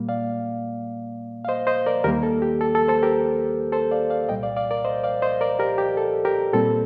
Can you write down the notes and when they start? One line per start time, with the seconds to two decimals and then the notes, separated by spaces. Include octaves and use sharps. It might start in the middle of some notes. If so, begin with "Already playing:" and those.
Already playing: A#2 G3 A#3
0.09 D5 F5
1.45 F5
1.48 C5 D#5
1.67 C5 D#5
1.86 A#4 D5
2.04 D#2 D#3 G3 A#3 G4 A#4
2.23 A4
2.42 G4
2.61 A4
2.75 A4
2.88 A4 C5
3.03 G4 A#4
3.72 A4 C5
3.91 D5 F5
4.10 D5 F5
4.29 C2 A#2 G3 D#5 G5
4.43 D5 F5
4.56 D5 F5
4.71 A#4 D5
4.85 C5 D#5
5.04 D5 F5
5.22 C5 D#5
5.41 A#4 D5
5.59 G4 A#4
5.78 G4
5.97 A4
6.25 G4 A#4
6.53 A#2 G3 C4 A4